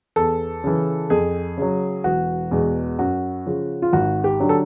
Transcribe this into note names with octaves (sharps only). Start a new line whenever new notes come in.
E2 A4
C#3 E3
F2 G#4
C#3 F#3
E1 F#4
E2 B2 G#3
F#2 F#4
C#3 F3
F4
G#1 F#4
G4
D3 F#3
A4